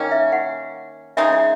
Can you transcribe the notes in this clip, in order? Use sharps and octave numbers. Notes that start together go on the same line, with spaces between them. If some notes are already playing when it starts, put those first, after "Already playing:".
Already playing: D#3 A#3 C#4
E5
F#5
C#3 G#3 D#4 G#4 E5
E5